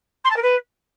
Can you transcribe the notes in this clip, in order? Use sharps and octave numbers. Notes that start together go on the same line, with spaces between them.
C6
A5
A#4
B4